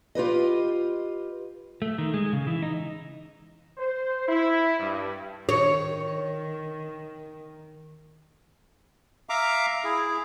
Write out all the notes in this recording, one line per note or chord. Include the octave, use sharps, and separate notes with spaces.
F4 G4 B4 D#5
A3
D#3
G#3
C#3
E3
D#4
C5
E4
G2
D#3 C#5
E5 F5 A#5 D6
E4 G#4